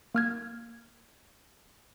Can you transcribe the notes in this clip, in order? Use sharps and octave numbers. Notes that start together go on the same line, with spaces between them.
A#3 F6 G#6